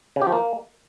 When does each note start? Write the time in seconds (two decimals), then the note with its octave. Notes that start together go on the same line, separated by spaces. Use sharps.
0.16 C#3
0.22 G4
0.27 F3
0.32 A#3